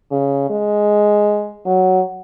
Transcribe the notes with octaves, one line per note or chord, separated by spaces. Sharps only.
C#3
G#3
F#3